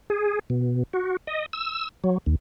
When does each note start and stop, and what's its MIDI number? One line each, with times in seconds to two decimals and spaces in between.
0.10 0.39 68
0.50 0.83 47
0.93 1.17 66
1.27 1.46 75
1.53 1.89 88
2.04 2.18 54
2.26 2.35 39